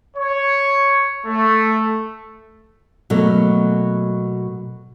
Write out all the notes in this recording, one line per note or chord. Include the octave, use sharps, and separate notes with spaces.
C#5
A3
B2 F#3 A3 A#3